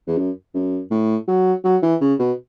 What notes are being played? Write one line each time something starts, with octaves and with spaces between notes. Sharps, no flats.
E2
F#2
F#2
A2
F#3
F#3
E3
C#3
B2